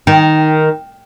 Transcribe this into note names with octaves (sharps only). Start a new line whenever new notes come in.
D#3